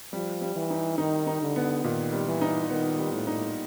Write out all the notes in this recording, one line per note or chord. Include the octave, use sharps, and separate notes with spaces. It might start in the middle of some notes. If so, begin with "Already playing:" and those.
F3 G3
G3
E3
D#4
D#3 D#4
D#4
D3
B3
A#2 D#3
G3
E3
D#4
D#3 B3
G3
A2
D#4